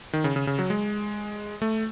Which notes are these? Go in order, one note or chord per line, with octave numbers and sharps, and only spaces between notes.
D#3
C#3
C#3
C#3
F#3
G#3
A3